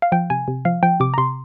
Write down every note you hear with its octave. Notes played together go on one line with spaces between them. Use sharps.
F5
F3 G5
C3 G#5
C3
F3 F5
F3 G5
C3 D6
A#5
C3 C6